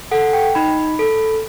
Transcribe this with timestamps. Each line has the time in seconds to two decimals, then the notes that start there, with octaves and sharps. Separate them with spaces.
0.11 A4 F#5
0.33 G5
0.55 D#4 B5
0.99 A4